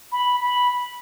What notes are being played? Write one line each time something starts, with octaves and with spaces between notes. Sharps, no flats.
B5
B5